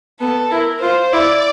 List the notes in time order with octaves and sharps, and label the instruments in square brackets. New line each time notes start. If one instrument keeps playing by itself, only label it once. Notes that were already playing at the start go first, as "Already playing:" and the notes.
[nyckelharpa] B3 [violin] A4
[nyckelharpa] E4 [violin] A#4
[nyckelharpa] F4 [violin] C5
[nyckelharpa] E4 [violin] D5